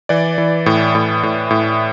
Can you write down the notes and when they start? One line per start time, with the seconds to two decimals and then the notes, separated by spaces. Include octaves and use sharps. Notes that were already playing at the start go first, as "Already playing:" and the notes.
0.09 E3 D5
0.38 E3
0.66 A2
0.95 A2
1.23 A2
1.51 A2